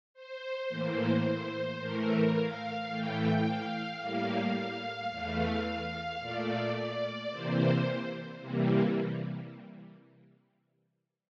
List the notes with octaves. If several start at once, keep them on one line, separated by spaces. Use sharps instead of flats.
C5
A2 E3 A#3
A2 E3 A3 A#4
F5
A2 E3 A3 G5
F5
A2 G3 A#3 F5
F5
E2 E3 A3
A#2 A3 D5
D5
C3 E3 A#3 C5
C3 E3 G3 A#3